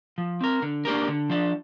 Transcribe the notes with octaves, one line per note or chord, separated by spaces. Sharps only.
F3
C4 A#4
D3
A#3 D4 G4 A#4
D3
F3 D4